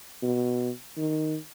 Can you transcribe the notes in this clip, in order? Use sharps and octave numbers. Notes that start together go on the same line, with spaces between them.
B2
D#3